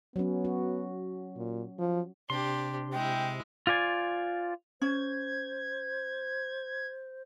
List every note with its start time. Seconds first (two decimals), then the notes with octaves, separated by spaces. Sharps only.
0.16 F#3 B3 C#4
0.45 F#4
1.37 A#2
1.78 F3
2.30 C3 D4 G4 C6
2.93 G#3 E4 G5
3.67 F4 C5 D5 G#5
4.82 C#4 C5 G#6